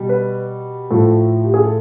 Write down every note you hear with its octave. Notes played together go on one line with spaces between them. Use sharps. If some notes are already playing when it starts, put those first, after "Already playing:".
Already playing: B2 G3
B4
A2 F3 A3 A4
G4
G#4
A4